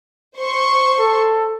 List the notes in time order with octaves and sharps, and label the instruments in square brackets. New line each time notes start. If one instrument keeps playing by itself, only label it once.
[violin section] C5 C6 C#6
[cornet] A4